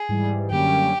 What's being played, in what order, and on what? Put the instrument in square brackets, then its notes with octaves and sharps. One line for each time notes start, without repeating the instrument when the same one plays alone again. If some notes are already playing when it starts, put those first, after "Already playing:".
Already playing: [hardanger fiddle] G#4
[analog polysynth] G#2 E3 G3
[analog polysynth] F#2 D3 G3 A#3 C#4 [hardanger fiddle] G4